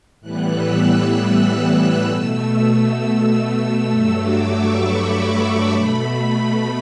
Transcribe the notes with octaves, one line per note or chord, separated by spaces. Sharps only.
A2 E3 G3 B3 F#6
E6
F#6
B2 A3 E6
G2 F#3 A3 E6
D6
C#6
B5
B2 A3